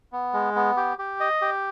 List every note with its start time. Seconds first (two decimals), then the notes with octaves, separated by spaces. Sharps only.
0.12 B3
0.33 G#3
0.56 B3
0.77 G4
0.99 G4
1.20 D#5
1.42 G4